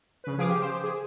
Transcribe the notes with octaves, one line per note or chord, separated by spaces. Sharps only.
C#3 B4
F3 G#4 F5 D6 D#6
G4
C5
G#4